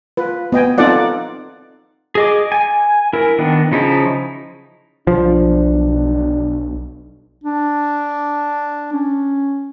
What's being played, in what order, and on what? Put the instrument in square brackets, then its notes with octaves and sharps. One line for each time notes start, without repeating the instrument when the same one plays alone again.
[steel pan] F4 B4
B3 D#5 G5 G#5
C4 D#4 F4 A4 D5 F#5
[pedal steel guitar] G#4 D#5 D6
G#5
E4 A#4
D#3 B3 D4
C#3 F3 D#4 E4
[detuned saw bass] B1 [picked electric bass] F3 [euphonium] D4
[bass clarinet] D4
C#4